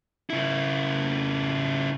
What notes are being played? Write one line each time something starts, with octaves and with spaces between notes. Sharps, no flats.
C#3 E4